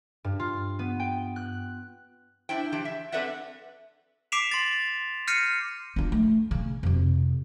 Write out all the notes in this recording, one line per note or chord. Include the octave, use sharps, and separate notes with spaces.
G2
F4
B3
G5
F#6
D4 E4 C5 G5
E3 F3 G4 G5 A5
E5
C4 A4 B4 D5 E5 F#5
D6 B6 C7 D7 E7 F7
C6 A6
F6 G6 A#6 C7 C#7 D#7
D4 F4
A3
C#3
F2 C3